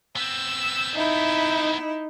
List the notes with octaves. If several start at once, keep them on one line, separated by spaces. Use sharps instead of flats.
B3 C4 E6
D#4 E4 E5